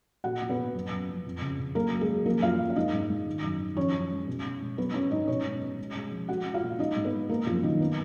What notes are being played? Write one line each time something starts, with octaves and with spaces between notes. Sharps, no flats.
A#2 F#4 F#5
A#2
B3 B4
A#2
F#2
F#2
F3
F2
C#3
C#3
F#3 A#3 A#4
F#3
G#3 G#4
F#3
F3 A#3 A#4
F#2 F4 F5
F#2
F5
G#3 D#4 D#5
G#2
G#2
D#3
F#2
D#3
F3 C#4 C#5
F#2
G#3
B2
B2
G#3
F#3 B3 B4
F#3 C#4 C#5
G#2 D#4 D#5
B2 C#4 C#5
G#3
B2
G#3
G#3
F3
G#3 F#4 F#5
G#3
F4 F5
A#2
G#3 D#4 D#5
G#2
B3 B4
G#3
G#3 A#3 A#4
F#2 F3 F4
F#2 D#3 D#4
B3